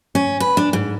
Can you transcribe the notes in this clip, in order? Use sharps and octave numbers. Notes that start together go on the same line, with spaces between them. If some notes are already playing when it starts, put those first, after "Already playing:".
C#4
B4
D4
G#2